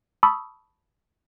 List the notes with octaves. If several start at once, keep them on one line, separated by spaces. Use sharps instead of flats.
A5 B5 C#6 D#6 E6